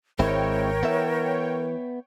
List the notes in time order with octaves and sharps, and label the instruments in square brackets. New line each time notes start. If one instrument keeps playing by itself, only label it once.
[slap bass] G#1 [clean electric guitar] G#3 C4 E4 [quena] A#4 [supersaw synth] C#5 G5
[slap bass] E3 [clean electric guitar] B3 E5